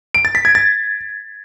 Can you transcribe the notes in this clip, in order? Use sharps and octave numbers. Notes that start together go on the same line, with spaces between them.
D7
A6
B6
G#6
A6